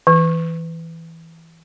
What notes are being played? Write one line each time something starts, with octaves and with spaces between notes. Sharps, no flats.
E3